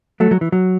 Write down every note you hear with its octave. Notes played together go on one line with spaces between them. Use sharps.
F#3 A3
F#3
E3
F#3